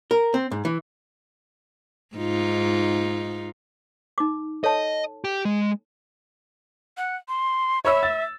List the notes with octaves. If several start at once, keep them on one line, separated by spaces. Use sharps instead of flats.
A#4
C4
G#2
E3
G#2 D#4 F4
D#4 D6
A4 C#5 D#5 A5
G4
G#3
F#5
C6
C#5 E5 B5 E6
A6